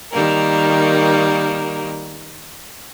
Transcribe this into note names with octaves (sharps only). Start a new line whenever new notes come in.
D#3 G3 A#3 A#4